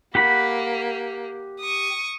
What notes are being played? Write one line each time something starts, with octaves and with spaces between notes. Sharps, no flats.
A#3 G4 F#5 B5
C#6 D#6